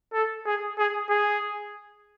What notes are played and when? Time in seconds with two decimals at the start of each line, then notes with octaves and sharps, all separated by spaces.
0.13 A4
0.46 G#4
0.78 G#4
1.10 G#4